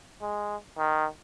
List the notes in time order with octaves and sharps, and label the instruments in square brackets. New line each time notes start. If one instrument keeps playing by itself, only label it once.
[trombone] G#3
D#3